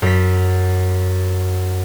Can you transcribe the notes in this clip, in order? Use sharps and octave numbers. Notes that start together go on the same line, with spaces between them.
F#2 B6